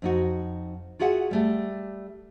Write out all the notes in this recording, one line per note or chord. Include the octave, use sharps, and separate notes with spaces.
F2 D#4 F#4
F4 F#4 G#4 E5 F#5
G3 A3 G4